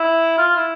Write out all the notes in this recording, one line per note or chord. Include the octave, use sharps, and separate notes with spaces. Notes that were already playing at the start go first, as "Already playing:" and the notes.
Already playing: E4
F4
E4